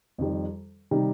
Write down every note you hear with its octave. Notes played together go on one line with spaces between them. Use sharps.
F2 D#3 G3
C3 D#3 G3 D#4